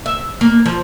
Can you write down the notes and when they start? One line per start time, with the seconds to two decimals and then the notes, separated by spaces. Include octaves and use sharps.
0.06 E5
0.41 A#3
0.66 F3